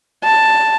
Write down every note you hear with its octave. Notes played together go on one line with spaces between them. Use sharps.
A5